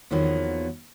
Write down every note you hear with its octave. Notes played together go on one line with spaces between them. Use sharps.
E2 D#3 F3 F#3 A#3 B3